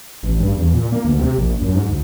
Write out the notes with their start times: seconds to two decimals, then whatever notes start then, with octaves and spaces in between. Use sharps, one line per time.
0.23 A1
0.40 G2
0.56 E2
0.74 A#2
0.92 A#3
1.04 D2
1.19 C3
1.38 A#1
1.61 F#2
1.75 G#2
1.89 D2